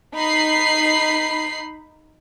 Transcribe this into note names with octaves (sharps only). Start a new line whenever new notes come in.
D#4 B5 C7